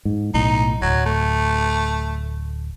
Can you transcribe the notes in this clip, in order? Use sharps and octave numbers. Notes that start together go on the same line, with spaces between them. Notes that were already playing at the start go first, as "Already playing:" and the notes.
G#2
B1 A2 D#4
D1 F#3
A3